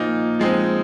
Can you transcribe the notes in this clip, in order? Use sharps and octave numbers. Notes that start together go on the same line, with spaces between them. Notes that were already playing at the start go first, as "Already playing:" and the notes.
Already playing: A#2 F3 A#3 D#4
F3 G#3 C4 D#4